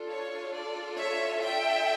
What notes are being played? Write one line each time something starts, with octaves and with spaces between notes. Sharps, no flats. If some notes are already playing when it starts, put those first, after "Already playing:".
Already playing: D4 F4 A4
C#5
D5
C#5 E5
E5 G5